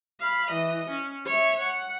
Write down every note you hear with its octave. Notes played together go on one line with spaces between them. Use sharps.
F5 B5
E3 D#5
C#4
C#5 E5
F#5